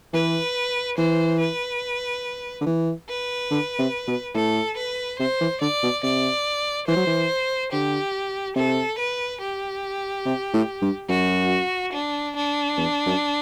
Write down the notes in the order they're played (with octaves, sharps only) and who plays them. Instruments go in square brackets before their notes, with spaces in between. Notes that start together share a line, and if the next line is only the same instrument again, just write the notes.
[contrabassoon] E3 [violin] B4
[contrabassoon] E3 [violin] C5
[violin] B4
[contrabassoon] D3
E3
[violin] B4
[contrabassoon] D3
C3
B2
[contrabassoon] A2 [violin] A4
[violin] B4
[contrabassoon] C3 [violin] C5
[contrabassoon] E3
[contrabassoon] D3 [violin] D5
[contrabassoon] B2
[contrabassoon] C3 [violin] D5
[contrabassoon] E3 [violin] C5
[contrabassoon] F#3
E3
[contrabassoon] D3 [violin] G4
[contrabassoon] C3 [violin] A4
[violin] B4
G4
[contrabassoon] C3
A2
G2
[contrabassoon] F#2 [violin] F#4
[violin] D4
D4
[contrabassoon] E2
F#2